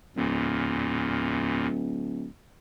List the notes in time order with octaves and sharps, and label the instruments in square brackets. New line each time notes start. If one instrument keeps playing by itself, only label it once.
[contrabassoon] D1 [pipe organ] E2 A#2